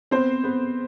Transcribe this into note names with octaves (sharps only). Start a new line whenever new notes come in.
B3 C4 C5
B3